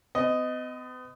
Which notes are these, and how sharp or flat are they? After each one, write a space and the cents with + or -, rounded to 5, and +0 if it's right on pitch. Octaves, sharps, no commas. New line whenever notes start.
B3 +45 D#5 +0